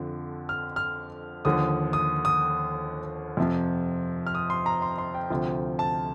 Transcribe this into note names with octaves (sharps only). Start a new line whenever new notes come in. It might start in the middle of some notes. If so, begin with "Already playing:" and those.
Already playing: F2 D3 F3
F6
F6
D#2 D3 F3 D#6
D#6
D#6
F2 C3 F3
F6
D#6
C6
A#5
C6
C6
G5
D2 C3 F3
A5